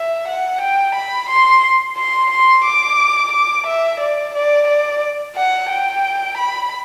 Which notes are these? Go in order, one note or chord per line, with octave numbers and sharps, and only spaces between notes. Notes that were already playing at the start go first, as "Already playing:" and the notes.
Already playing: E5
F#5
G5
B5
C6
C6
C6
D6
D6
E5
D5
D5
D5
F#5
G5
B5